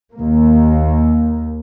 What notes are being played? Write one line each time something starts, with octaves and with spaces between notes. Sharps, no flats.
D#2 A#3